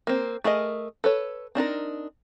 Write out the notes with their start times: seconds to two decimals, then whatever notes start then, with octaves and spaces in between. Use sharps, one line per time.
0.07 A#3 C4
0.44 A3 G#4 A#4 D#5
1.04 A4 B4 C#5
1.55 C4 D4 D#4 A#4